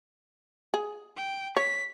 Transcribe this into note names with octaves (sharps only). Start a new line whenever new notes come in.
G#4
G5
C#5 B6